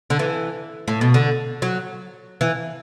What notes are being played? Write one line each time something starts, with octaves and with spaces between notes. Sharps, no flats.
D3
E3
A2
B2
D3
F#3
E3